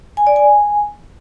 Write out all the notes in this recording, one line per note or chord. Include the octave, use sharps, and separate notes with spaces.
G#5
D5
G#5